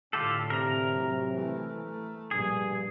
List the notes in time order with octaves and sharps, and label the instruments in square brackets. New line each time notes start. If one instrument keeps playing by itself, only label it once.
[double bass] A2 D3 [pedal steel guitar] F4 G4 A4
[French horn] C3 [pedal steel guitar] A#4 A#5
[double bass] A1 F#3
E3 A3
A3
[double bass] A#1 [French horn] G2 [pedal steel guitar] G#4